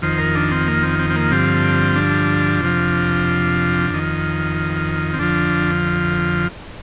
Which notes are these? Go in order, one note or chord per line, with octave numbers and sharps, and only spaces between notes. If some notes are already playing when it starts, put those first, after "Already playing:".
F2 D#3 C5
A#4
D4
C4
A#3
C4
C4
C4
A#3
G2 D3 F3 C4
D4
F2 C3 F3
F2 D#3
C4
F2 D3 F3 D4